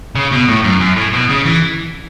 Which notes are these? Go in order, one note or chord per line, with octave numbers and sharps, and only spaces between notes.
C#3
B2
A2
F#2
F#2
A2
B2
C#3
E3